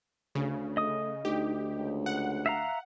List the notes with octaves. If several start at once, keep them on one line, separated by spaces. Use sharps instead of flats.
D2 C#3
A3 D#5 D#6
D2 D#4 G4
C#2
F#5
E5 F5 A#5